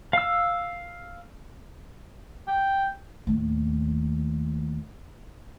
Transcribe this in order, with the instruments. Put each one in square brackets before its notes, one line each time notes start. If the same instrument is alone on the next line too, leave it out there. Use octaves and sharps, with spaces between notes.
[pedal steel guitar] F5 E6
[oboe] G5
[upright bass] D#2 A2